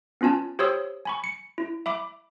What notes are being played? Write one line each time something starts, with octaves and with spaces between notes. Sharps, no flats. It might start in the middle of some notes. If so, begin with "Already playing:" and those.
B3 C#4 F4 G#5 A5
G4 C5 C#5 C6 D#6 E6
G#5 B5 C#6
C#7
E4
E5 B5 D6